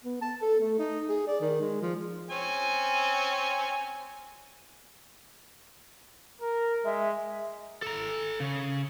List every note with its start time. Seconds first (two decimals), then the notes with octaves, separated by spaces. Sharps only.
0.04 B3
0.21 A5
0.42 A4
0.61 A3
0.79 D#4
1.09 G#4
1.28 D5
1.41 D#3
1.61 G#3
1.82 F3
2.30 C4 C#4 G#5
6.41 A#4
6.85 G#3 E5
7.82 A4 A#5
8.40 C#3